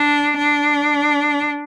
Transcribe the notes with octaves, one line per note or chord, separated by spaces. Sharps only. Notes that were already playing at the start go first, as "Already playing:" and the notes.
Already playing: D4
D4